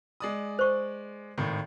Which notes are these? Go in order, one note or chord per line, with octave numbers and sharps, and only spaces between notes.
G#3 D5 D#6
C5 C#6
G#1 A2 D#3